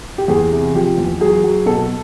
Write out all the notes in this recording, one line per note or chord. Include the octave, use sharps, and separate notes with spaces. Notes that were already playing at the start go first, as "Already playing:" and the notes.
G4
E2 G#4
C3
F3 G4
E2
F#3 G#4
F#3
B2 A4